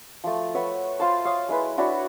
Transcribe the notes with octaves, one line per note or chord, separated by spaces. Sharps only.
F3 A3
B4 C#5 E5 F#5
F4 C5 A5
C#5 F5 D#6
G#3 E4 B4
D4 E4 F#4 C#5